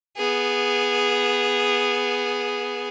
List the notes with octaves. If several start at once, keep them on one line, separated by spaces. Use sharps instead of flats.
B3 G#4